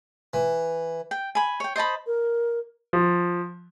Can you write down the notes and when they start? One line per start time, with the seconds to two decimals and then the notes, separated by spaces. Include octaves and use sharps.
0.33 E3
1.11 G5
1.35 G#5 B5
1.60 C#5 G5
1.76 C5 D#5 A5 B5
2.07 A#4
2.93 F3